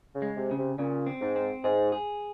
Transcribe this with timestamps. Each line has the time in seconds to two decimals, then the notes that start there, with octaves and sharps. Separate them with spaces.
0.15 C#3
0.22 G#3
0.37 C3
0.51 C#3
0.58 C3
0.78 A#2 C#3
1.07 C4
1.21 G#2
1.36 C4
1.64 G#2 G#4
1.92 G#4